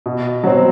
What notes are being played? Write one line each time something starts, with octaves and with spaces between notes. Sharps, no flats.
B2
F#3 C4